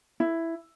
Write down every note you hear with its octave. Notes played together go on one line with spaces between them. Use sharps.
E4